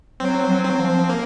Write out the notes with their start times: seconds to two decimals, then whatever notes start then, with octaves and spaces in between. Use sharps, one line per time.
0.20 F#3 C4
0.49 F#3
0.65 F#3 C4
0.79 F3
1.09 A#3